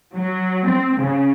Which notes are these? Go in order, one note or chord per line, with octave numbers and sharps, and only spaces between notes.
F#3
C4
C#3